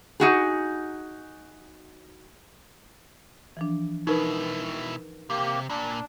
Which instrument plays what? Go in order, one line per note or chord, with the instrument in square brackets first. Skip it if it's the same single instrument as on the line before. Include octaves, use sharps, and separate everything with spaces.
[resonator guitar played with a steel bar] D#4 F#4 G#4
[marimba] E3 F3 D4
[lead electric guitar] B2 E4 [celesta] D#4 A#4 B4
[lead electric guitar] C3 [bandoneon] A#3 G4
[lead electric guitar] A#2 [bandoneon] D4